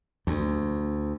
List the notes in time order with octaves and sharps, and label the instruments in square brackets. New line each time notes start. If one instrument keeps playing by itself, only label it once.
[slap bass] D2